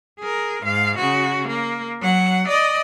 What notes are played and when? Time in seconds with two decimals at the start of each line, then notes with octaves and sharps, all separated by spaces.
0.19 G#4 A#4
0.64 G#2 F5
0.98 C#3 F#4
1.48 A#3
2.00 F#3 F#5
2.48 D5 D#5